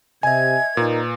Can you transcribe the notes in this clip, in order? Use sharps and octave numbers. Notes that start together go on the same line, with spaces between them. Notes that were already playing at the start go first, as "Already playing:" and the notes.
C3 D#5 E5 G#5 G#6
A#2 A#3 D#4 A#4 B4